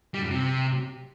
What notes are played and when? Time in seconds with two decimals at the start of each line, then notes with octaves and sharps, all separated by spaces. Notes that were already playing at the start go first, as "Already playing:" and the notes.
0.14 G3
0.22 F#2
0.30 C3